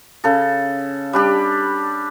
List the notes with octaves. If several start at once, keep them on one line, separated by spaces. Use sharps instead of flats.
C#3 A4
G3 D4 G4